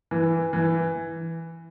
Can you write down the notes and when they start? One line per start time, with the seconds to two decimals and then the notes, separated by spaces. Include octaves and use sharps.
0.11 E3
0.53 E3